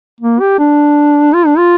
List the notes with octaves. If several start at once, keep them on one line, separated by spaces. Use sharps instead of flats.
A#3
G4
D4
F4
D4
F4